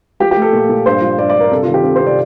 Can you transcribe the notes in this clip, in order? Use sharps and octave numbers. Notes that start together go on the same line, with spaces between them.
F3 G4
G4
A3
A4
A#2
A#2
G2 C5
F3
G2 D5
D5
G2
A#4
C3 A4
F4
D#3
G4
C4 A4
C5
C3
D5